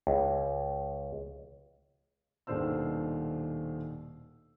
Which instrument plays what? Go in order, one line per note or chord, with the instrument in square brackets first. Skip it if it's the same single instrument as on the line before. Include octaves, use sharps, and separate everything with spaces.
[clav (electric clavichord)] C#2
[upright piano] D#1 B2 D#3 D4 C5 E6